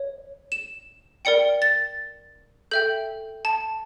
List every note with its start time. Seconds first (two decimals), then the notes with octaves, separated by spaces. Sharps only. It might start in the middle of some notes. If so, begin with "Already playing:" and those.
Already playing: C#5
0.52 E7
1.25 A#4 D5 G5 C#7
1.62 A6
2.71 A4 E5 G5 G6
3.45 A5